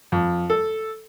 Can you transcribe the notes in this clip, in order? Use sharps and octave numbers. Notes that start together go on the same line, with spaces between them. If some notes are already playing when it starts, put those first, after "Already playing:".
F2
A4